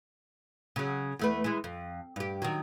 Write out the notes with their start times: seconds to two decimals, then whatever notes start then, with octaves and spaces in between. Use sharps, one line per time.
0.76 C#3 F#3
1.19 E2 A3 B4
1.44 E3 G#3
1.64 F2
2.16 G2 G4
2.42 D#3 F#3